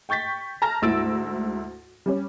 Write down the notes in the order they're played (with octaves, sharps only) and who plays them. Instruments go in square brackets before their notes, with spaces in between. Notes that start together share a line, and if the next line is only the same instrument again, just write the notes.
[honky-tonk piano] G5 C#6 G6 A6 B6
A5 A#5 F6 A#6
D2 G#2 E4 E6 A6 D7
G3 C#4